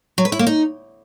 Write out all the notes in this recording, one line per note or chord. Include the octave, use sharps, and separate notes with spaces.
F#3
B4
E4
A#3
D#4